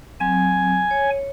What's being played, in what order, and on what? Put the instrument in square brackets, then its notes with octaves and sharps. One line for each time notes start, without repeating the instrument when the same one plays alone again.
[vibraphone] F#3 C4 [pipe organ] G#5
[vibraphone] C#5